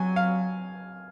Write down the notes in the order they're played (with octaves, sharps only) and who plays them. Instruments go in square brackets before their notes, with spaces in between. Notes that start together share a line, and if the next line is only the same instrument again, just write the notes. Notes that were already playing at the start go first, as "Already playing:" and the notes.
Already playing: [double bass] F#3 [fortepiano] G#5
[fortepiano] F5